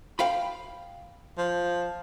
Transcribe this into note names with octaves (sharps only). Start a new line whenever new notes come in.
F5 G5 B5
F3